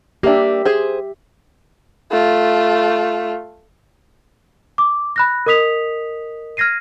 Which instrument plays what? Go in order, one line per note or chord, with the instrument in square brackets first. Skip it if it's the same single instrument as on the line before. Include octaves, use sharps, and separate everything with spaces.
[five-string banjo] A#3 D4 [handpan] G4 E5
[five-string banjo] G#4 C5
[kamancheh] A3 F4
[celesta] D6
B5 F#6 A#6
A#4 D#5 D#6 B6 F7
F6 G#6 A#6 C7 D#7